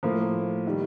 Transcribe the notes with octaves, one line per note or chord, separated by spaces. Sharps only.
A2 F3 A#3
D#3 G3